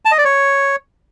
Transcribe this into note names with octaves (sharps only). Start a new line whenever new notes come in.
A5
D#5
D5
C#5